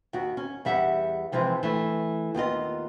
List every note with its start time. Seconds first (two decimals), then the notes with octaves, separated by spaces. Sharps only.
0.13 D#2 F#4
0.37 C#4
0.65 E2 G3 E5 F#5
1.32 C3 E3 F3 G#3
1.63 E3 A3
2.34 D#2 B3 F4 D#5